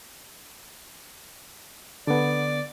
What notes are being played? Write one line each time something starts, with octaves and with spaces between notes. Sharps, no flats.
D3 B3 D5